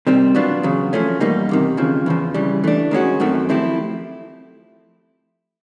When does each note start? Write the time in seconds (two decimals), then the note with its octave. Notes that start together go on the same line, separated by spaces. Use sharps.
0.07 C3 D#3 G3 C4
0.35 B2 F#3 B3 D4 F4
0.63 E2 C#3 F#3
0.93 F3 A3 C#4
1.20 E2 B2 G3 A#3 D#4
1.49 E2 C3 D#3
1.77 F2 C#3 F3
2.06 E2 C#3 F3
2.34 C#3 E3 G3
2.64 E3 A3 D4
2.91 D#3 G#3 C#4 F#4
3.20 F#2 D#3 F#3 A3 C4
3.49 F3 A3 C4 E4 G4